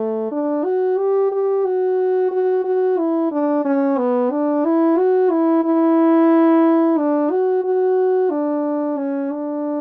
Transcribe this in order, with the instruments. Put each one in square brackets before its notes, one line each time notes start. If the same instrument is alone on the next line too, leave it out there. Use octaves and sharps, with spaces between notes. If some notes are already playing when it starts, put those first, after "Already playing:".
Already playing: [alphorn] A3
D4
F#4
G4
G4
F#4
F#4
F#4
E4
D4
C#4
B3
D4
E4
F#4
E4
E4
D4
F#4
F#4
D4
C#4
D4